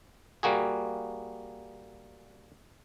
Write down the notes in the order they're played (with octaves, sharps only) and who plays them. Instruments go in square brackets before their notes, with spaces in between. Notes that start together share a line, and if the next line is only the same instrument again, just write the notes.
[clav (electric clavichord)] G3 A#3 F#4 G#4